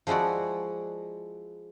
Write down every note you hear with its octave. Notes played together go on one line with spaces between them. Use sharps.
F3 G#3 E4 F#4 D5